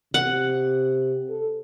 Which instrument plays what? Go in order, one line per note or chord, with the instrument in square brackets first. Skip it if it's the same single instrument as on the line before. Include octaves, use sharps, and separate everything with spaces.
[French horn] C3 [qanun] F#5
[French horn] A4